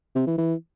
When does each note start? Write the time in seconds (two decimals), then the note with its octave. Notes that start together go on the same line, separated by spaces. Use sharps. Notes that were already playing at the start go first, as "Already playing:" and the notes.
0.15 C3
0.27 E3
0.38 E3